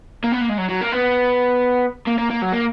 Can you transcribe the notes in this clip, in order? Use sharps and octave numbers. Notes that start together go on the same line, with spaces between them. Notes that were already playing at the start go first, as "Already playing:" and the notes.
A#3
B3
A#3
G#3
F#3
F#3
A#3
B3
A#3
A#3
A#3
F#3
A#3